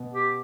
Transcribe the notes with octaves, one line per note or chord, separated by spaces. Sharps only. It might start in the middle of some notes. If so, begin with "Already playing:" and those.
Already playing: B2
G4